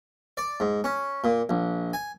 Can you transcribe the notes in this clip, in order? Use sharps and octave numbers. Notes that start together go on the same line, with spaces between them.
D5
G#2
C#4
A#2
A#1
G#5